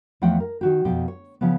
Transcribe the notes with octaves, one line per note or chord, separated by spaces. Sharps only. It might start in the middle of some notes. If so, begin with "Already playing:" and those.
E2 F3 A3 F#5 G5
A#4
D#3 F#4 G4
F2 B2 G4
C#5
C#3 F3 B3